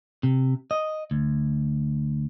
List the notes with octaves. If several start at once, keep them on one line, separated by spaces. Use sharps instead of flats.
C3
D#5
D2